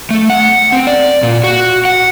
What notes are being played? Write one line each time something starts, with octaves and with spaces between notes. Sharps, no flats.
A3
F#5
C4
D5
A#2
F#4
F#5